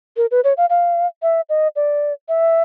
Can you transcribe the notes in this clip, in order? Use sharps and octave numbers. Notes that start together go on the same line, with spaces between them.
A#4
B4
C#5
F5
F5
E5
D#5
D5
E5